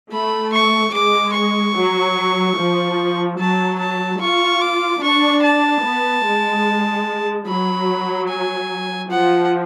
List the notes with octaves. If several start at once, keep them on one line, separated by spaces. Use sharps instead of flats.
A3 B5
C#6
G#3 D6
C#6
F#3
F3
F#3 A5
A5
F4 C#6
D6
D4 C#6
A5
B3
G#3
F#3 B5
G#5
F3 F#5